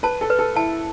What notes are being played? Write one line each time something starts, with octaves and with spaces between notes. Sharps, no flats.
B4 A5
A4
B4
A4
E4 A5